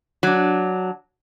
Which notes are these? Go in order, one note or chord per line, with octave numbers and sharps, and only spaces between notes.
F#3 D4